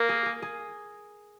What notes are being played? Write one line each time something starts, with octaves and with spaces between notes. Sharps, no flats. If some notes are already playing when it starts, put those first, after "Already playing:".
Already playing: A#3 A#4
G#4
G#4
G#4